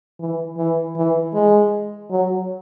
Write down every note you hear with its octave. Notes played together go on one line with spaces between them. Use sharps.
E3
E3
E3
G#3
F#3